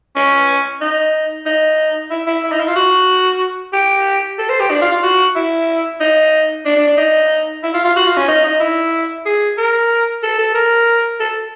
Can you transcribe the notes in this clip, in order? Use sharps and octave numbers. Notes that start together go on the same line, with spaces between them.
C#4
D#4
D#4
E4
E4
E4
D#4
E4
F4
F#4
G4
A4
C5
G4
D4
F4
F4
F#4
E4
D#4
D4
D4
D4
D#4
E4
F4
F4
F#4
F4
C#4
D#4
D#4
E4
G#4
A#4
A4
A4
A#4
A4